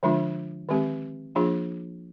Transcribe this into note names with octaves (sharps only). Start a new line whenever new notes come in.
D3 F3 G#3 D4 F4
D#3 G#3 C4 G4
F3 A#3 D4 F4 G#4